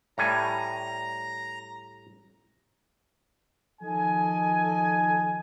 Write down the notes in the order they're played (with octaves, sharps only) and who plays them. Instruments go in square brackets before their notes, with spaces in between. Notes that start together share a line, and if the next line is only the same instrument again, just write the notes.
[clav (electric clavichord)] A2 G3 G#5 [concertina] A#5
[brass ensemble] D#3 F3 A4 D#5 G#5